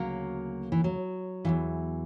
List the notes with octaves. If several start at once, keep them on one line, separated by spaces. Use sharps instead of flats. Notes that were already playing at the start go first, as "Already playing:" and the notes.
Already playing: D2 C#3 F#3 A#3
E3
F#3
E2 C#3 E3